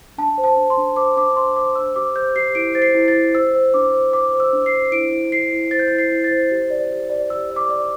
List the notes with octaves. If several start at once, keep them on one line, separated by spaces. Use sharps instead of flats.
D4 A5
C5
A5
D4
C6
D4
C5 D6
D4 D6
C5 C6
C5 D6
C5 E6
G4 D6
C5 G6
G4 C7
E4 D7
C5 A6
C7
E4
A6
E4
C5 E6
C5
D4 D6
C5
C5 D6
C5
E6
D4
C7
C5
E4 D7
E4
E4 C7
E4
C5 A6
G6
A6
E4
C7
E4
A6
C5
G4
D5
G4
D5
G4 E6
D5
D6
D5